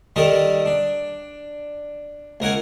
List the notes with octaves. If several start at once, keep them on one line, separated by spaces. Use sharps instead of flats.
D#3 G3 D#4 A4 A#4
D4
C#2 A#4 F#5 G#5